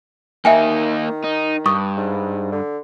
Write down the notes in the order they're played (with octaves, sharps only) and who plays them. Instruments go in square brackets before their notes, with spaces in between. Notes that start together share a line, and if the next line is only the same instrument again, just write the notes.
[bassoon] D#3 [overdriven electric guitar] A#3 D#4 [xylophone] E5 G5 G#5
[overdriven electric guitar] D#4
[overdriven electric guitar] G2 [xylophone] C#6 D#6
[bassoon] G#2
D3